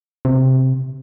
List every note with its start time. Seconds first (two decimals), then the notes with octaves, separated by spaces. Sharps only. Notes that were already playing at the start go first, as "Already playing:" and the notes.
0.25 C3